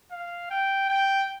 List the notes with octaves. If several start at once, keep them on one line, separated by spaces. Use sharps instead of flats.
F5
G5
G5